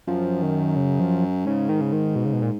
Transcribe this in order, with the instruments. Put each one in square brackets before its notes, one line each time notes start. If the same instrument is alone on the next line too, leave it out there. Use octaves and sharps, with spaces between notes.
[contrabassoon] F#2 [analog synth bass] F3
[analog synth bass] D#3
C#3
F3
[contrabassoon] G#2 [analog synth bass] C#3
[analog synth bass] D#3
C#3
D#3
B2
C#3
B2
A#2